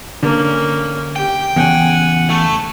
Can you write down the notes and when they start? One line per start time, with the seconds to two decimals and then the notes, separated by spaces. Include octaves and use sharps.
0.23 D3 A#3 C#4
1.16 G4 G5
1.56 E2 C#3 F#5 G#5
2.30 A3